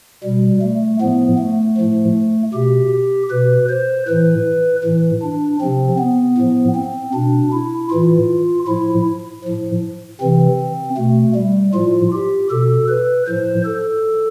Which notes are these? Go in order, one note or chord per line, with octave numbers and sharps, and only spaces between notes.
B2 G3
A3
A2 F3 B3
A3
A2 F3
B2 G4
B2 B4
C5
A2 E3 B4
A2 E3
D4
C3 F3 C4
B3
A2 F3
C4
B2 D4
E4
A2 E3 F4
A2 F3 E4
A2 F3
C3 E3 C4
B2 A3
G3
A2 F3 F4
G4
B2 A4
B4
A2 F3 C5
A4